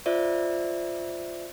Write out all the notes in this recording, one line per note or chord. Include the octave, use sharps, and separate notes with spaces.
F4 C5 D5 E5